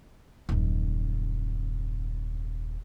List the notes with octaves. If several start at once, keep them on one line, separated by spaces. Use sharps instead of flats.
D#1 F#2